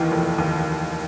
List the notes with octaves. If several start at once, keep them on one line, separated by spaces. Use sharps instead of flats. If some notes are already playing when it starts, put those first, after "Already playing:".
Already playing: D#2 D#3 E3
F1
D#2